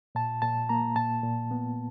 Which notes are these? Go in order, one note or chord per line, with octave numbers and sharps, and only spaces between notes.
A#2 A5
A#2 A5
A#3 A#5
A#2 A5
A#2
B3